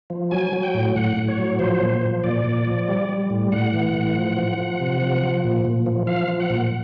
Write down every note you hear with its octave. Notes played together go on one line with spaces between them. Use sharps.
F3
F#3 G#5
F#3
G5
A2
A2 F#5
A2
C#5
F#3
F3 C5
A#2
F3
A#2 D5
A#2
F3
G3
G3
A2
A2 F#5
E3
A2
F3
F3
F3
C3
F3
F3
A#2
A#2
F3
F3 F5
F3
F#5
A#2